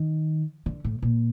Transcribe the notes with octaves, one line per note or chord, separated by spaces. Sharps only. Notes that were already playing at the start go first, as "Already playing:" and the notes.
Already playing: D#3
D3
A2
A#2